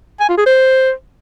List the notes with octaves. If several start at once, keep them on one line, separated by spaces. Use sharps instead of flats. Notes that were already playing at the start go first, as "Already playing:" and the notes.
G#5
F4
G#4
C5